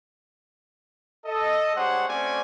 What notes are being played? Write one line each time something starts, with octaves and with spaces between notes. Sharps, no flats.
A4 D#5
G#3 D4 G4 C5 C#5 F#5
A3 C4 C#4 F#4 D5 G#5